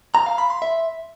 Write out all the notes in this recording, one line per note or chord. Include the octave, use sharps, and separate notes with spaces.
A#5
F5
B5
C6
E5